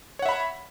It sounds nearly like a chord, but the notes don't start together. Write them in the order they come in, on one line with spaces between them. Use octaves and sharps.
C#5 F#5 E5 B5